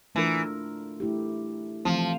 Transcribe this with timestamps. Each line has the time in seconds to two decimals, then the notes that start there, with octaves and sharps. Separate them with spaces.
0.15 E3 A3 D4 F4 A#4
1.00 A3 E4 G4
1.85 E3 F3 A3 C4